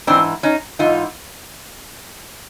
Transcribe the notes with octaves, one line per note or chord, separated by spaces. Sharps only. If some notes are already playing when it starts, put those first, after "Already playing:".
G#2 E3 C4 D4
C#4 D#4
G#2 E3 D#4 F4